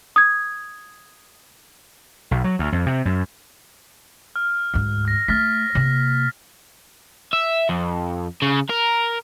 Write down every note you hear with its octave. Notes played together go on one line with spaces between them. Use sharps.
D#6 G#6
B1
F#3
D2
F2
C3
F#2
F6
D2 G#2
F6 A#6
A3 F6 A6 B6
C3 A#3
E5
F2
C#3
A#4